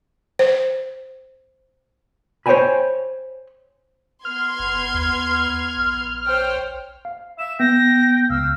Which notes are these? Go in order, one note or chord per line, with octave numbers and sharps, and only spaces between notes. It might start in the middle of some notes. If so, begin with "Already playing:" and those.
C5
C5 C#5 E5 G5 G#5 B5
B3 C6 F6 G#6
G1
D#2
A#1
C5 C#5 G5
F5
E5 E7
B3 G5 A#6
C#2 F5 E6